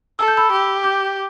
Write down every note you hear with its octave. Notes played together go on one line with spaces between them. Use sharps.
A4 E6
G6
B5 E6
G4
D6 G6